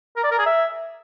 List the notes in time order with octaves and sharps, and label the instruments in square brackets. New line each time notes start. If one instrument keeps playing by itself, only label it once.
[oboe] A#4
D5
A#4
G#4
E5